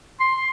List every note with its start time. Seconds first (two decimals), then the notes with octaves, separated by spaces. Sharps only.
0.21 C6